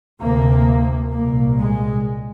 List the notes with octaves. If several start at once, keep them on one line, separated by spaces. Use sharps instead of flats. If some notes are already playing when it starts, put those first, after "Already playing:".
D2 C3 A#3
C2 A#2 A#3
G#3